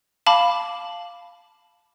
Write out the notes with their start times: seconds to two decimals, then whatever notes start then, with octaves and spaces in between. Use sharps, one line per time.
0.26 F5 A5 B5 D6